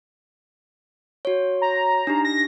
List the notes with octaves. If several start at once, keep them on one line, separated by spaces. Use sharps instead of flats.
F#4 C#5
A#5
D4 D#4 G4
A#6